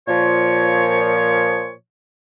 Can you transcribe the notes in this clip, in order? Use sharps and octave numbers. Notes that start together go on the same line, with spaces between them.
A#2 F3 C#5